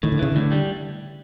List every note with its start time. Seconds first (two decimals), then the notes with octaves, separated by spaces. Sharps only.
0.03 A2 D#3
0.12 D3
0.19 C#3 E3
0.32 A2 D3
0.52 G3